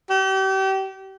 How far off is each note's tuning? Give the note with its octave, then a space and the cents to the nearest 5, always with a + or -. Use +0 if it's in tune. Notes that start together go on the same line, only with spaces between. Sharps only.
G4 -35